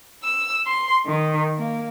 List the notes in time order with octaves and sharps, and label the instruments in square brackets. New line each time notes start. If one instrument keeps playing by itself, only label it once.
[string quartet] E6
C6
D#3
A#3